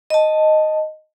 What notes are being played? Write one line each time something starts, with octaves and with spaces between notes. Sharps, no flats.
D#5 A5